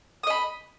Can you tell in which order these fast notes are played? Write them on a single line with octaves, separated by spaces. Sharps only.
D#6 D#5 B5